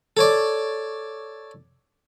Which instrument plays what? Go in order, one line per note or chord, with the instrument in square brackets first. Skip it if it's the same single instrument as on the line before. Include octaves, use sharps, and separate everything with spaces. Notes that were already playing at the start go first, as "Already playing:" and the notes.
[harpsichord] A4 C#5 D5